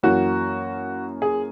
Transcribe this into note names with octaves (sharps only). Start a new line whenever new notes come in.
F#2 E3 A#3 F#4
G#4